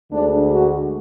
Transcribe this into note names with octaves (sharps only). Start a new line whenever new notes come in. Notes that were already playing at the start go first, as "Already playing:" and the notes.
D2 D3 G#3 D4
F#4